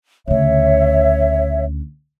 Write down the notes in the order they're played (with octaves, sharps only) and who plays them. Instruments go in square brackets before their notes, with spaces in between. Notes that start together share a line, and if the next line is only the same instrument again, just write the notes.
[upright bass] D2 C#3 [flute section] C#5 E5